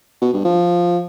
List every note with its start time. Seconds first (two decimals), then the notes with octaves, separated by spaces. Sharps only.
0.21 B2
0.33 G2
0.44 F3